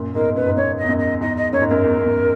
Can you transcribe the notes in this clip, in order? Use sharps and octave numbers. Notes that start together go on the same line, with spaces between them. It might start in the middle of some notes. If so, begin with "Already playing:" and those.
Already playing: F#2 A#2
E2 G#2 A#4
F#2 B4
G#2
F#2 C#5
D#5
E2
F#2
D#5
E2 G#2 D#5
D#5
F#2 C#5
G#2
F#2 A#4
E2
E2
F#2